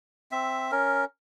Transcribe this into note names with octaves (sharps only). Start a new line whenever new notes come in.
C4 E5
C#4 A#4